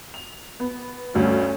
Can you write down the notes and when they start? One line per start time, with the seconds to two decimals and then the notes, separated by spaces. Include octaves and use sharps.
0.14 F7
0.60 B3
1.14 D2 G2 A3 C#4 F#4